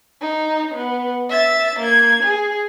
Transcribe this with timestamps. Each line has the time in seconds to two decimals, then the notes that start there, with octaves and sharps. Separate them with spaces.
0.21 D#4
0.74 B3
1.30 E5 A6
1.79 A#3 G#6
2.23 G#4